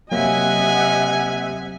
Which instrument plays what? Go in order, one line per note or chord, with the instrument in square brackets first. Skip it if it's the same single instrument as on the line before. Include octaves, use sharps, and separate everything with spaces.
[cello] C3 E5 [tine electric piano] F#3 A#3 [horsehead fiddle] D#5 F#5 [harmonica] G#5